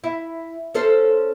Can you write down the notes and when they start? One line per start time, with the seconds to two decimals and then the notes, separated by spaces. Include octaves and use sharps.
0.04 E4
0.74 C#4 A4 C5